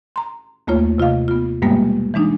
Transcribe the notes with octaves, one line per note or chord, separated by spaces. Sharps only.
A#5 C6
D#2 A3 A#3 F4 C#5
C3 F4 D#5 F5
B3 F4
G2 B2 G3 G#3 A#3 B3
E3 G#3 D4 D#4